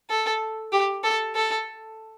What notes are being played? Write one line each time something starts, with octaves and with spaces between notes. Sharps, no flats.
A4
G4
A4
A4